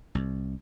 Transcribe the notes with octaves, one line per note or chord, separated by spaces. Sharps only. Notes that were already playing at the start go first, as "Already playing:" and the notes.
C2